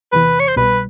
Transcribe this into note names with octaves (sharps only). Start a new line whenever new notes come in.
E2 C3 E3 B4
C#5
C5
C2 B2 G3 B4